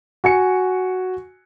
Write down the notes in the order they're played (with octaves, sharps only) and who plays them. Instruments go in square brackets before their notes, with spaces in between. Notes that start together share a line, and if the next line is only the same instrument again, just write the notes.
[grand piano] F#4 G#5 C#7